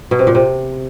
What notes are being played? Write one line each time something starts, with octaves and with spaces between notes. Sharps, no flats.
B2
C3
A#2
C3